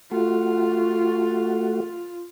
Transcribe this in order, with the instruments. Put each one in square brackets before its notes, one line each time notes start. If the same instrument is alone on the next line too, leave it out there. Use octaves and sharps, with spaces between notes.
[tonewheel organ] A3 F#4 [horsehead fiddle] F4